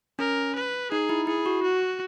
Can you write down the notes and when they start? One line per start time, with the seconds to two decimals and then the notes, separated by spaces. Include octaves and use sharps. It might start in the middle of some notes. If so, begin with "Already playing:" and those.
0.19 C#4 A#4
0.55 B4
0.91 D#4 G#4
1.09 E4
1.27 E4 G#4
1.46 F#4
1.63 F#4